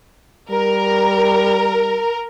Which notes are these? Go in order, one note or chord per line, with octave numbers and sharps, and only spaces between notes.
G3 A#4